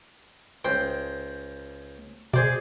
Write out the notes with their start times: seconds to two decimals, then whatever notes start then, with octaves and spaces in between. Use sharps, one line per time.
0.64 C#2 C5 G5
2.34 B2 G#4 C5 D5